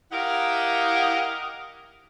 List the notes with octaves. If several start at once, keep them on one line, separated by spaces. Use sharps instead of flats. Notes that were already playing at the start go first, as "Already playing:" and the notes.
E4 G4 A#4 D#5 F5 F#5